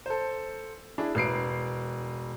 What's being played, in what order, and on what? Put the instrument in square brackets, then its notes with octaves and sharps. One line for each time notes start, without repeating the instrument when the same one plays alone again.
[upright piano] A4 C5
D4 E4 G#4
E1 B4 C7 D7